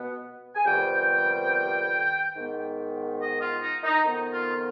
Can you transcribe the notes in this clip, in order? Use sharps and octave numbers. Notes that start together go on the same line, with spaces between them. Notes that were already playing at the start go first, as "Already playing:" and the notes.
Already playing: B2 B3
G#5
F2 C3 D#3 G3 B3 G5
G#2 D#3 B3
D#5
F4
D#4
D#4
F2 D#3 B3
F4